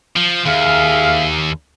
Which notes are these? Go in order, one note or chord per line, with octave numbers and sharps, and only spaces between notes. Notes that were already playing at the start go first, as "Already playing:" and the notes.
F3
D#2 G#4 E5 F5